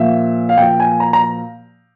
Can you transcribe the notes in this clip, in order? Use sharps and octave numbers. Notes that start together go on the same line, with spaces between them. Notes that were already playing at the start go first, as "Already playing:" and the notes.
Already playing: A#2 F3 E5
F5
A#2 F3 G5
G#5
A#5
A#5